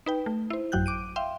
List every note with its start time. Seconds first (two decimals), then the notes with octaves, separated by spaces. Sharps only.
0.06 D#4 B4 G5
0.26 A3
0.50 E4 C5
0.72 A1 F#2 F#3 G5 F#6 G6
0.86 D6 D7 D#7
1.16 E5 F5 G5 C6